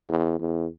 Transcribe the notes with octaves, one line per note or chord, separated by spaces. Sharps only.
E2
E2